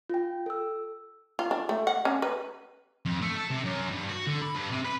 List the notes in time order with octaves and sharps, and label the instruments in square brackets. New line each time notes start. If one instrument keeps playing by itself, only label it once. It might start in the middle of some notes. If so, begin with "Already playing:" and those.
[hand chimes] F4 G5
A4 E6
[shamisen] F4
D4
A3
F#5
C#4
B4
[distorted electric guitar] F2
A3
A4
C3
F#2
G2
F#4
D3
B5
G2
C3
B4